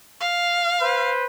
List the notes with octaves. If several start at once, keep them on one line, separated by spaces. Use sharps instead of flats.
F5
B4 C5